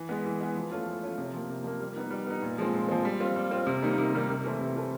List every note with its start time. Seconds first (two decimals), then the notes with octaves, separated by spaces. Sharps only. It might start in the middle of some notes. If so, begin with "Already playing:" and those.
Already playing: E3
0.09 G#3 B3
0.25 E3
0.40 G#3 B3
0.56 F3
0.71 A3 C#4 F4
0.86 F3
1.02 A3 C#4 F4
1.18 C3
1.34 F3 A#3
1.49 C3
1.64 F3 A#3
1.80 G3
1.96 B3 D#4
2.11 G3
2.27 B3 D#4
2.43 A#2
2.58 F3 G#3 C4
2.73 A#2
2.89 F3 G#3 C4
3.05 G3
3.20 C4 F4
3.36 G3
3.51 C4 F4
3.67 C3
3.82 D#3 G3 A#3 D#4
3.98 C3
4.13 D#3 G3 A#3 D#4
4.29 C3
4.45 E3 A3 C4 E4
4.61 C3
4.76 E3 A3 C4 E4